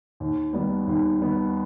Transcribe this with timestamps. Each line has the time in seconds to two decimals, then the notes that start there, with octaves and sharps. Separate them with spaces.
0.20 D#2
0.53 D#3 G3 B3
0.87 D#2
1.21 D#3 G3 B3